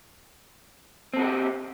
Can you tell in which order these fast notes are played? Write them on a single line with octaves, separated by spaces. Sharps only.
C4 A4 F#4 A#4 G4